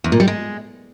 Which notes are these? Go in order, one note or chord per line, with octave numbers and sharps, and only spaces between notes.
E2
A#2
G3
G#3